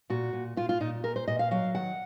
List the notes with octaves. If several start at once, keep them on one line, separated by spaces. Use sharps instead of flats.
A#2 F#4
A#2
A#2 F4
F4
A#2 D#4
A#2 A#4
C5
A#2 D#5
F5
F#3 F5
D#3 F#5